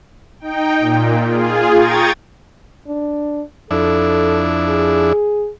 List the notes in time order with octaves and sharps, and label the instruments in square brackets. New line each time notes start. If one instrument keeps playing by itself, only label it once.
[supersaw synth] D#4 G5
A#2
F4 G#4
G5 A#5 C#6 D#6 G#6 A6
[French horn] D4
[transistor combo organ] F2 D4 E4 [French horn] A4
[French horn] G#4